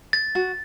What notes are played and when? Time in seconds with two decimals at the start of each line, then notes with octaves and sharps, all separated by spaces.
0.13 A6
0.35 F#4 A6